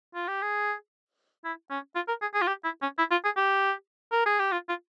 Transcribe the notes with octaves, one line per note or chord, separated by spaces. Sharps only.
F4
G4
G#4
E4
C#4
F4
A#4
G#4
G#4
F4
G4
E4
C#4
E4
F4
G#4
G4
A#4
G#4
G4
F4
F4